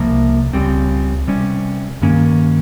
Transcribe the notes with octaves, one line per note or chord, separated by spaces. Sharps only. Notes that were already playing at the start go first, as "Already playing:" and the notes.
Already playing: C2 C3 F3 A#3
C#2 C#3 G3 C4
C3 G3 C#4
G2 D#3 A#3 C#4